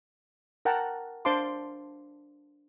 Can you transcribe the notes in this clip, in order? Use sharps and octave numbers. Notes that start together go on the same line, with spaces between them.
A#4 F#5 G5 A5 A#5
D4 C5 F5 A5 C6 D6